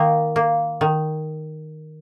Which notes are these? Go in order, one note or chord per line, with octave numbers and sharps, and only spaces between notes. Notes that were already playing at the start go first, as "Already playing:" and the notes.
Already playing: D#3 A#3 A#4
A#3
D#3